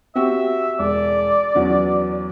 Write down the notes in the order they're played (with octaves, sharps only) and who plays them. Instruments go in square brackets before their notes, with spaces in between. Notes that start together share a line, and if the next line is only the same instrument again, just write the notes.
[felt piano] C4 F#4 G4 [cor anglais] E5
[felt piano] E1 [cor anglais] D5
[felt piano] E2 F#3 C#4